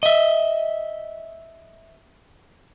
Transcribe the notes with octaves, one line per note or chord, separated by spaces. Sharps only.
D#5 E5